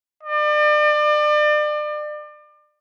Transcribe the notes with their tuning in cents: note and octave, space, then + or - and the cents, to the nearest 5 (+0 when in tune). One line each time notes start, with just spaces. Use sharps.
D5 +35